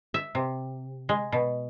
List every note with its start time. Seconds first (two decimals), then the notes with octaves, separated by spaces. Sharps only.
0.14 E5
0.35 C3
1.09 G#3
1.32 B2